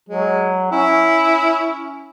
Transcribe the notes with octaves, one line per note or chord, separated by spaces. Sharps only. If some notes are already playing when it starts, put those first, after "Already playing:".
F#3 G#3
C#4 E4